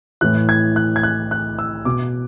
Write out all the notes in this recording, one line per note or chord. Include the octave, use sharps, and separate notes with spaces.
A2 E3 F#6
G#6
F#6
G#6
F#6
F#6
E6
B2 D6